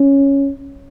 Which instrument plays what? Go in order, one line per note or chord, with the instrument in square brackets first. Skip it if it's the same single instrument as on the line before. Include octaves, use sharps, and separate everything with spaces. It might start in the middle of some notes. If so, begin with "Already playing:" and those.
Already playing: [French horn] C#4